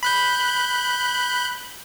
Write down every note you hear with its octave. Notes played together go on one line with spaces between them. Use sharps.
B5 F#6 G6